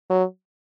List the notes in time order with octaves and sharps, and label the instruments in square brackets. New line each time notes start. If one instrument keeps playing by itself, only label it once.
[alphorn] F#3